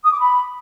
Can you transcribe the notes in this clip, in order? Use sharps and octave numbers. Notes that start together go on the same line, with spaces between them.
D#6
D6
B5